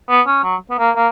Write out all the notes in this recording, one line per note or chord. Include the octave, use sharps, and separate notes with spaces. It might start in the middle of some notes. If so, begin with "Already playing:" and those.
B3
C#4
F#3
B3
A#3
A#3